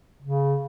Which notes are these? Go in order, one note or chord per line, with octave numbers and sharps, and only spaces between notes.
C#3